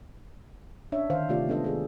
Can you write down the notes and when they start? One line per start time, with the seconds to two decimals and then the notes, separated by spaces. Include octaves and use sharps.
0.92 C#4 D4 C#5 E5
1.10 D3 D#3 C5 F5
1.29 C3 A3 C4 F4 G4 D5
1.48 G#3 B3 D4 A4 D#5
1.64 D#3 G#4 A4